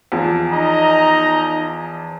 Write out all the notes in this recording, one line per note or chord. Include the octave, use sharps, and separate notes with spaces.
E2 F3
D#4 D#5 A#5